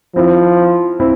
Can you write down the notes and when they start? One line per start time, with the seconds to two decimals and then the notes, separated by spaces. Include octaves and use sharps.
0.16 F3 C4 E4
1.00 C4 E4